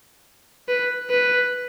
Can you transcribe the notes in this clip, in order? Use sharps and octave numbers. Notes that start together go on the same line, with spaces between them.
B4
B4